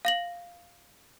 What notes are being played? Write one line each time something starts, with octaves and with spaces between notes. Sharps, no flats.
F5 A#6 F#7